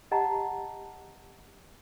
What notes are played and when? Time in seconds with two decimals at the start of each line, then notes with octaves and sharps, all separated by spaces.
0.11 G4 D#5 F#5 A5 A#5